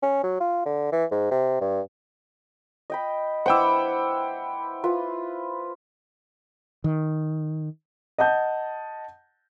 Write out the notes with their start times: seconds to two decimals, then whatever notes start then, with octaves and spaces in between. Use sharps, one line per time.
0.03 C#4
0.23 F#3
0.40 F4
0.66 D3
0.92 E3
1.12 G#2
1.31 C3
1.61 G2
2.90 D#5 G5 B5
3.46 E4 B4 C5 F#5 G5 D6 E6
4.84 F4 B4
6.84 D#3
8.18 D#5 F#5 A5 G6